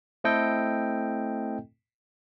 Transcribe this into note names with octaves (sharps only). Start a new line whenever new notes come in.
A3 C4 E4 A4 D#5 G5